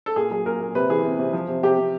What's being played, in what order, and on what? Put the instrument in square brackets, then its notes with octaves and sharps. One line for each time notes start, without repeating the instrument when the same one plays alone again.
[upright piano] A4
A#2 G#4
F#3 G#4
A#2 A#4
A#2
C3 B4
E3 G#4
C3
C3
F3
C3
C3 G4
C3